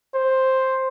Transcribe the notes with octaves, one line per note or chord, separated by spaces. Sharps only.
C5